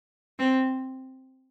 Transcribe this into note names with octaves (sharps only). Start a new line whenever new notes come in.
C4